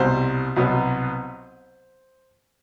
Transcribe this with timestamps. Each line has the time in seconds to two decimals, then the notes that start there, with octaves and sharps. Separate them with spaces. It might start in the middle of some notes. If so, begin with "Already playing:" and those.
Already playing: C2 B2 G3 C5
0.56 C2 B2 F#3 B3